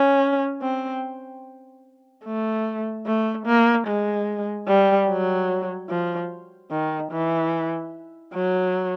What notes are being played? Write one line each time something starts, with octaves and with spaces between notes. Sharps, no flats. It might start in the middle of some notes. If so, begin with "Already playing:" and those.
Already playing: C#4
C4
A3
A3
A#3
G#3
G3
F#3
F3
D#3
E3
F#3